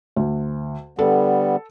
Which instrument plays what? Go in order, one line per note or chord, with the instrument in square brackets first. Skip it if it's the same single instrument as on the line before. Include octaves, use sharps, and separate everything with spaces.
[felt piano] D2
[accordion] D3 G3 B3 [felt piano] A4